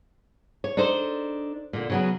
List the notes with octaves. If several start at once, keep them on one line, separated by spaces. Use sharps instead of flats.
C#5
D4 D#4 A4 C5
A#2 D3
C#3 F#3 B3